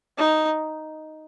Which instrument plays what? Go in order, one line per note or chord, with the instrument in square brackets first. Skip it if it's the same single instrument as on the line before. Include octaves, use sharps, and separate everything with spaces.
[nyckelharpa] D#4